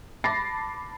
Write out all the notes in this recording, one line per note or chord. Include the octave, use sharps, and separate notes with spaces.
A5 B5 D6 A6 A#6 C7